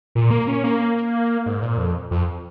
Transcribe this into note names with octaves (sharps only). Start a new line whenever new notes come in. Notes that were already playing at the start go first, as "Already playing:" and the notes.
A#2
A#3
C#4
A#3
G#2
A#2
F2
F2